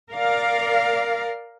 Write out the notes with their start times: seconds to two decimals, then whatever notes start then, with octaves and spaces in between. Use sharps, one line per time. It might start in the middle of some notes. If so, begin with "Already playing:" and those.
0.12 A#4 D5 F5